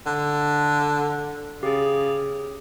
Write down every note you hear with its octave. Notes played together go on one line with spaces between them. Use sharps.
D3
C#3 G4 G#4